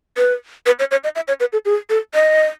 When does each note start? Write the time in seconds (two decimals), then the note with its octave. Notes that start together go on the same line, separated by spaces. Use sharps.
0.18 B4
0.66 B4
0.79 C#5
0.91 C#5
1.04 D#5
1.16 E5
1.28 C#5
1.40 B4
1.53 A4
1.65 G#4
1.90 A4
2.14 D#5